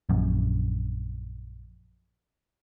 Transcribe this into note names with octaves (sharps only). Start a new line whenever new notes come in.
A#1 F#2